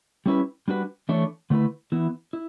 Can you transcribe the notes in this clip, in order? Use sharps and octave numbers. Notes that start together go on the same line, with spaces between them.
G3 C#4 E4 B4
G3 D4 F#4 B4
E3 A3 D4 A4 C#5
D3 A3 E4 B4
E3 B3 E4
E4